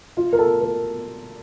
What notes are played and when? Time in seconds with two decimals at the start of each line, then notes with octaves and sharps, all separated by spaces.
0.17 F4
0.33 A#4
0.39 A4
0.61 A#4